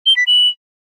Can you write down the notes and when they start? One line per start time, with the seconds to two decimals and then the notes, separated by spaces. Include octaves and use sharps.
0.06 G7
0.17 B6
0.27 F#7